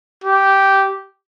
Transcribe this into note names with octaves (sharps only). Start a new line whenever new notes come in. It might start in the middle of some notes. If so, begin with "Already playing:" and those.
G4